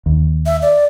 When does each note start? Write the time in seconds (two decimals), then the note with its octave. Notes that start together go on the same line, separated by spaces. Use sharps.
0.06 D#2
0.46 E5
0.62 D5